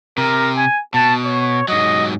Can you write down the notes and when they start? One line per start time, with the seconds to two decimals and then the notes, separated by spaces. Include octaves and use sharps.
0.18 C3 A#4
0.57 G#5
0.94 B2 A5
1.25 C#5
1.68 G#2 F#3 D#5